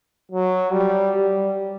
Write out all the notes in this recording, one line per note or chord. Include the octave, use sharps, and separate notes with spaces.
F#3
G3
G3